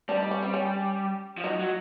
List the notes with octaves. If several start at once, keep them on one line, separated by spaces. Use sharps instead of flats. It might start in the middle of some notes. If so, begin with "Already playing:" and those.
G3 D4
D#4
C#4
C4
C#4
F3
F#3 D#4
F#3